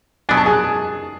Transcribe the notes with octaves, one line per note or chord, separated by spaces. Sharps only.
B2 F#3 B3 D4 G#5
A5
G#4 G#5